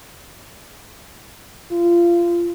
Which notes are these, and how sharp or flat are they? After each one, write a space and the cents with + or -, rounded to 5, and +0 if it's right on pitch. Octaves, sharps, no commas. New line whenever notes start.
F4 -25